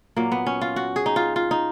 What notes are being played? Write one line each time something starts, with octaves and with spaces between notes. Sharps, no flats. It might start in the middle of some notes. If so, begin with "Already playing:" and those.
A#2 F#3 A#3
B3
C#4
F4
F#4
G#4
D#4
F4
F4
D#4